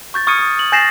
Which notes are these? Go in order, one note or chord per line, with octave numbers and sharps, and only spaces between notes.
C#6 G6 A6
C#6 D#6 F6 G#6 C#7 D#7
D#6
F#7
G#5 G6 A6 A#6 C7 E7